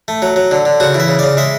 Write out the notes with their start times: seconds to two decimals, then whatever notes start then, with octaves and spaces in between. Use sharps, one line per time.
0.08 A3
0.22 F#3
0.36 F#3
0.51 D3
0.65 D3
0.80 C#3 F#4
0.94 E3
1.00 E5
1.08 C#3
1.19 C#3 D5
1.37 G#3 E5